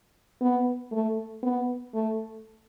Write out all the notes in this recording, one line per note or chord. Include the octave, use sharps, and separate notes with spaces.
B3
A3
B3
A3